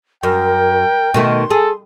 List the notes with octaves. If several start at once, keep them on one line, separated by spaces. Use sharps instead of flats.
F#2 A#4 G5
B2 D#3 A3 C6
G#4 A4